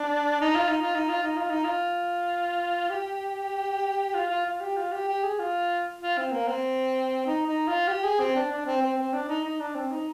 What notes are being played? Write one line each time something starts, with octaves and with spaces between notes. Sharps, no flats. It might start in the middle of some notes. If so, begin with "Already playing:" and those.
Already playing: D4
D#4
F4
D#4
F4
D#4
F4
D#4
F4
D#4
F4
G4
F4
F4
F4
G4
F4
G4
G4
G#4
F4
F4
C4
A#3
C4
D#4
D#4
F4
G4
G#4
C4
D4
D4
C4
C4
C4
D4
D#4
D#4
D4
C4
D#4